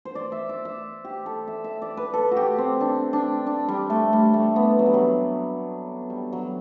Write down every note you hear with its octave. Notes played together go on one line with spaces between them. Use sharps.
C5
D5
E5
D5
E5
G4
A4
E5
E5
D5
B4
A4
F#4
G4
C4
D4
D4
D4
G3
A3
G3
A3
B3
F#3
G3
F#3
G3
F#3